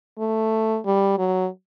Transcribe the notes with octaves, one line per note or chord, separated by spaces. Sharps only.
A3
G3
F#3